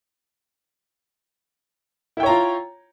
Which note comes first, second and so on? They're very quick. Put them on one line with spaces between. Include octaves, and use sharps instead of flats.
E4 G5 C#5 A#5 F4